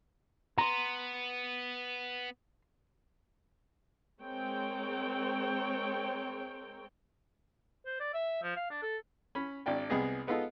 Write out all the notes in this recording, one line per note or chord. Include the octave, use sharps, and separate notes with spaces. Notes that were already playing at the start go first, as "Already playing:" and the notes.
B3 A#5 C6
G#3 C4 A#4 C#5 G5
C5
D5
E5
F3
F5
D4
A4
C#4 B5
G#1 D4 D5 G5
C2 C3 G#3 B3 G#4 D#5
G#3 B3 D#4 F4 A4